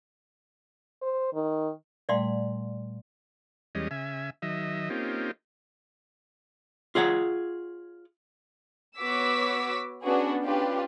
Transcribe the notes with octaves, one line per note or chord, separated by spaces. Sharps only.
C5
D#3
A#2 G3 A3 D5 F5 C6
E2 G3 G#3 C#4 D#5
C#3 E5 G#5
D#3 F#3 D#5 E5
A#3 C4 C#4 D#4 F4 G4
F4 G#4 C#5 F#5
B3 F#4 C#5 D6 E6 B6
B3 C#4 D4 F#4 G#4 B4
C#4 D4 F4 G4 B4